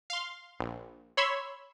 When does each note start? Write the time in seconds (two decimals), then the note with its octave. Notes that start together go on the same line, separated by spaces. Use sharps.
0.10 F5 C6
0.60 A#1
1.17 C#5 B5 C6 E6 G#6